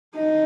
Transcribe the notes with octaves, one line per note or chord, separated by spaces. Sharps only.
D#4